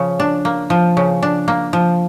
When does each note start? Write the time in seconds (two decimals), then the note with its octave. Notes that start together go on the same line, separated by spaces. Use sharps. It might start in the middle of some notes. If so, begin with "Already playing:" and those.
Already playing: C#3 F3
0.20 D4
0.45 A#3
0.70 F3
0.97 C#3
1.23 D4
1.48 A#3
1.73 F3